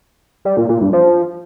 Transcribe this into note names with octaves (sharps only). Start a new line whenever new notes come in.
G3
A#2
A#2
G2
F3